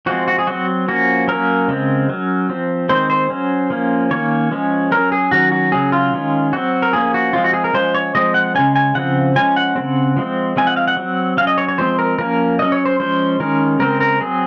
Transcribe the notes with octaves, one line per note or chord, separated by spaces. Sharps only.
F3 G#3 C4 F#4
F#4
G#4
F#3 C4 F#4
F3 A#3 C#4 F#4
F#3 A#3 C#4 A#4
C#3 G#3 C4
F#3 C#4
F3 C4
D#3 G#3 C4 C5
C5
F#3 C#4
F3 A#3 C#4
D#3 A#3 C#4 C#5
F3 G#3 C#4
F#3 C#4 A#4
G#4
D#3 F#3 C#4 F#4
F#4
C#3 F#3 C#4 G#4
F4
D#3 G#3 C#4
F#3 C4 F#4
A#4
F3 A#3 C#4 G#4
F#4
F3 G#3 C4 F4
F#4
G#4
A#4
F3 G#3 C#4 C5
C#5
F3 G#3 C4 D#5
F#5
C#3 G#3 C#4 G#5
G#5
C#3 F3 C4 F#5
F3 G#3 C#4 G#5
F#5
C#3 G#3 C4
F3 G#3 C4
F3 G#3 C4 G#5
F#5
F5
F#5
F#3 C4
F#3 C#4 F5
D#5
C#5
C#5
F3 G#3 C4 C5
A#4
F3 A#3 C#4 A#4
F#3 C#4 D#5
C#5
C5
F3 G#3 C#4 C5
D#3 G#3 C#4 A#4
C#3 G#3 C4 A#4
A#4
F#3 C4 G#4